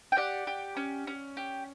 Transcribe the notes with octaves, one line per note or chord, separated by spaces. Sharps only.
G5
G4 D5 F#5
G4
C#4
C#4
G4